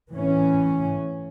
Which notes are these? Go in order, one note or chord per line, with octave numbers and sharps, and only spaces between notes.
A2 E3 C#4